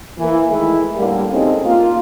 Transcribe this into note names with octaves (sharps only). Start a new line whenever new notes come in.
E3 A#3
D#3 E3 G#3 A3 E4
A2 D3 G3 A#3
C3 G#3 C4 C#4 D#4 A4
A#3 F4